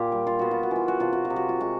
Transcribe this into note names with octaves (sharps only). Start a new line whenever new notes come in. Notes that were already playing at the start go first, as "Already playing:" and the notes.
Already playing: A#2 F4 G4
G3
F4
B3 F#4
F4
F#4
E3 F4
F#4
C3 F4
F#4
F4
C3
F#4
F4
G#3 F#4